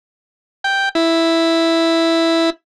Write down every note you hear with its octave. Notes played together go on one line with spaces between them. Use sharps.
G5
E4